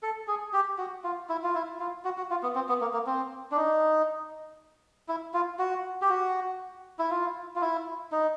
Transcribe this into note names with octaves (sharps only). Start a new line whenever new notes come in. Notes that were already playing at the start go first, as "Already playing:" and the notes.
A4
G#4
G4
F#4
F4
E4
F4
E4
F4
F#4
F#4
F4
B3
C4
B3
A#3
A#3
C4
D4
D#4
E4
F4
F#4
G4
F#4
E4
F4
F4
E4
D#4